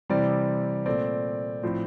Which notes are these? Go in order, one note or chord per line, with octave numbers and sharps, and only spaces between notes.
C3 E3 G3 C4 D5
A#2 A3 C4 D5
A2 F3 C4